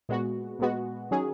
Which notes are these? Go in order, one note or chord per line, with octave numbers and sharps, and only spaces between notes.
A#2 G#3 B3 F#4
A#2 G#3 B3 F#4
D#3 F#3 C#4 G#4